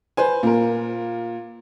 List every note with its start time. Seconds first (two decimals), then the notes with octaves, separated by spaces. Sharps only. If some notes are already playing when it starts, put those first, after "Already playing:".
0.17 B4 C5 G#5
0.43 A#2 A#4